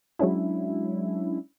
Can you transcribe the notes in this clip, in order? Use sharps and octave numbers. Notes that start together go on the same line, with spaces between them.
F#3 G#3 C#4 D4 E4